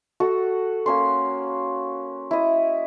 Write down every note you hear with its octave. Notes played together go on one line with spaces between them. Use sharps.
F#4 A4
A#3 C#4 C6
E4 D#5